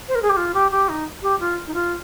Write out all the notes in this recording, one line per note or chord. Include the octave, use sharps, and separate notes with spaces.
C5
A#4
G#4
G4
F4
G4
G4
D#4
G4
F4
D#4
F4